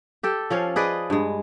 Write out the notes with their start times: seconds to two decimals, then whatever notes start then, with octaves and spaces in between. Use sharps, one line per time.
0.23 G4 A4 G5
0.50 F3 C#4 C#5 F5
0.76 G#4 B4 D5 D#5
1.10 G2 G#3